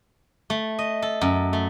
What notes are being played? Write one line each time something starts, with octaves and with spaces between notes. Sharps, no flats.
A3
D#5
A4
F#2
A3